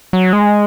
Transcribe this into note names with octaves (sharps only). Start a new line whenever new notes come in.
F#3
G#3